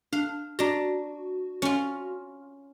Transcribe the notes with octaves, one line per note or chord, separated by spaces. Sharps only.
D4 F5
D4 F#4 A#5
C#4 F4